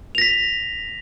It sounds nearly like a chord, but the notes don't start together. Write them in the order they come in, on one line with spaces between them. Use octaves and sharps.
F7 A#6 B6